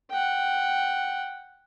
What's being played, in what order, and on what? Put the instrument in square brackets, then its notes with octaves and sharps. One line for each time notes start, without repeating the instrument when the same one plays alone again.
[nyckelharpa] F#5 G5